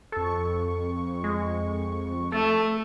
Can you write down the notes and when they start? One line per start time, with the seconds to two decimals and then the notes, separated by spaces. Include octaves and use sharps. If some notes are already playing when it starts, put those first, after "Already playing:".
0.12 F2 A4 C#6
1.24 G#3
2.32 A3 A4